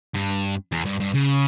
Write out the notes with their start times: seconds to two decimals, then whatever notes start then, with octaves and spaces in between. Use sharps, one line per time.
0.14 G2
0.72 E2
0.86 G2
1.00 G2
1.14 C#3